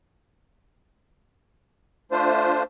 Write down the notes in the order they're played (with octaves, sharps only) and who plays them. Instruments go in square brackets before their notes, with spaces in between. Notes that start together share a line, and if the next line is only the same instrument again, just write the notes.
[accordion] A3 D4 F4 C5